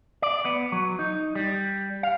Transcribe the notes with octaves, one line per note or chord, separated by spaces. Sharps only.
D5
B3
F#3
D#4
G3
F5